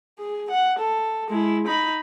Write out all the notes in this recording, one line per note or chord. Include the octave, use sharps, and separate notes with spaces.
G#4
F#5
A4
G#3 E4
D#4 B5